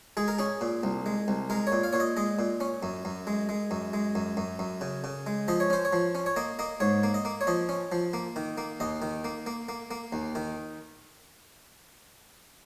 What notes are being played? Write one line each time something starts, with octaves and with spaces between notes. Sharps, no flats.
G#3 G#4
A#4
C#4 G#4
A#2
C2
G#3
C2
G#3 A#4
C#5
A#2
F5
A#2 C#5
D#5
G#3 D#5
A#2
C#4
F#2
F#2
G#3
G#3
F#2
G#3
F#2
F#2
F#2
C#3
C#3
G#3
F3 D#5
C#5
C#4 C5
C#5
F3
C#4
C#5
A#3 D#5
A#3 D#5
G#2 C#5
A#3
D#5
A#3
C#5
F3 D#5
C#4
F3
A#3
D#3
A#3
D#2 D#5
D#3
A#3
A#3
A#3
A#3
D#2
D#3